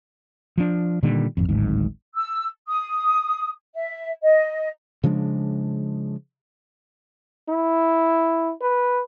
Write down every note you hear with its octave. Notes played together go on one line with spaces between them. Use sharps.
F3 D4
A#2 D3 D#3 G3
G#1 F2
D1 G#1 G#2
E6
D#6
E5
D#5
C#3 F3 G#3 D4
E4
B4